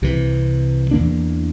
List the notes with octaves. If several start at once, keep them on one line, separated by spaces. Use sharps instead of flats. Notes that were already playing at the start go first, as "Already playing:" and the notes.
C2 C3 E3
E2 E3 A#3 D4